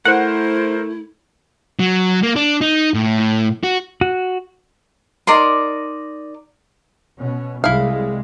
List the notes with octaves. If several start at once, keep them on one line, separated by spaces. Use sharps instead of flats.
A3 E4 A#4 C5 F#5
F#3
A#3
D4
D#4
A2
F#4
F#4
D#4 A#4 D5 C6
B2 C#4
C2 G3 G#3 E4 F5